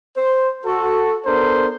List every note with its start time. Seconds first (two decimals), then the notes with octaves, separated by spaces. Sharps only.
0.17 C5
0.65 F#4 A4
1.26 B3 D4 A4 A#4 C5